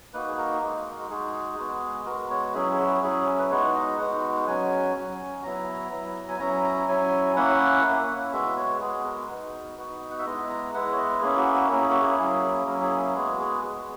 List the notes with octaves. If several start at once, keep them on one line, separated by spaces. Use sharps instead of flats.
A#3 D#4 F#4 B4
G#4
A#4
G#3 D#4 F#4
A#4
G#3 D#4 F#4 G#4
G#3 B3 F#4
G#3 B3 F#4 A#4
C#5
F#3 C#4 E4 G#4
G#4
F#4
F#3 C#4 E4 G#4
B4
G#3 B3 D#4 F#4 C#5
D#5
G#3 B3 D#4 F#4 F#5
F#3 C#4 F#4 G#5
F#3 C#4 F#4
F#3 B3 E4 A#5
F#3 B3 E4
G#5
F#3 C#4 E4 A#5
A#5
F#3 C#4 E4 G#5
A#3 C#4 E4 F#5
A#3 C#4 E4
G#3 B3 F#4 E5
C#5
G#3 B3 F#4 G#4
A#4
B3 D#4 F#4
B3 D#4 F#4
F#5
E5
G#3 B3 E4 D#5
A#5
G#3 B3 E4 F#5
C#5
D#5
A#3 C#4 E4 G#4
F#4
F#4
A#3 C#4 E4 A#4
G#4
F#4
G#4
F#3 A#3 C#4 E4
F#3 A#3 C#4 E4 A#4
G#4
G#3 B3 F#4 G#4
G#4
G#3 B3 F#4